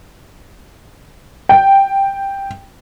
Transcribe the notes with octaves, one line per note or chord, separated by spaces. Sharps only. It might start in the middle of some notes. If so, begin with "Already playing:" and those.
G5